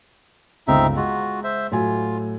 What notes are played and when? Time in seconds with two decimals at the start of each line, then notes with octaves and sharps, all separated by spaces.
0.68 G1 C#2 C4 D#4 E5
0.97 G#3 F4 F#4
1.44 C5 E5
1.72 A2 F#3 F4 G#5